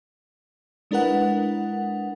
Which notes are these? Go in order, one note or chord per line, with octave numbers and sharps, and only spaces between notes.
G#3 D4 E4 A#4 B4 F#5